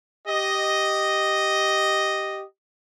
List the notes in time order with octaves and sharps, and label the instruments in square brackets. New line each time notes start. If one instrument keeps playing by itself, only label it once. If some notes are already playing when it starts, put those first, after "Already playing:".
[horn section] G4 D#5